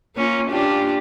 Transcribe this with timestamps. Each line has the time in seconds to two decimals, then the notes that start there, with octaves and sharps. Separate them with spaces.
0.16 A#3 C#4 F4
0.50 D4 F4 G4